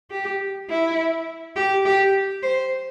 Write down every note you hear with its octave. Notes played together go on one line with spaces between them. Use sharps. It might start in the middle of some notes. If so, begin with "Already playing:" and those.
G4
E4
G4
G4
C5